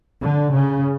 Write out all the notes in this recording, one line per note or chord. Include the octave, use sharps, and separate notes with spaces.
D3
C#3